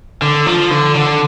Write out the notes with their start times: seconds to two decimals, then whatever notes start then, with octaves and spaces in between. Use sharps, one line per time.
0.22 D3
0.46 F3
0.71 D3
0.95 D3